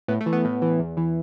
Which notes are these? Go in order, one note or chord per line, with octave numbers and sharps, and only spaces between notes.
A2 B3
A3
E3
B3
A2
E3
E2
E3